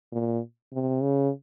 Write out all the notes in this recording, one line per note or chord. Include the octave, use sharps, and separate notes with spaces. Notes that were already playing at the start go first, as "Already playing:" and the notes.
A#2
C3
C#3